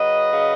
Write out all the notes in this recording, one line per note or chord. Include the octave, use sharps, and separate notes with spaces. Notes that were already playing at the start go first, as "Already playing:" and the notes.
Already playing: C#3 F#3 B4 D#5
C#3